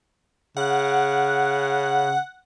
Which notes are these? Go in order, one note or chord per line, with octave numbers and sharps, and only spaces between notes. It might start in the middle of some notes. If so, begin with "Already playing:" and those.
C#3 F#5